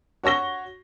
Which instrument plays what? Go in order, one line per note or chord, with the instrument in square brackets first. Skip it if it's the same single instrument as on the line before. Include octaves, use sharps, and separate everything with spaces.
[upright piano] F#4 C#5 C#6 A#6 G7